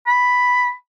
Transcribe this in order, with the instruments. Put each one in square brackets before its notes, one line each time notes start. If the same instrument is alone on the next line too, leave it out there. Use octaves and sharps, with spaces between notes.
[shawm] B5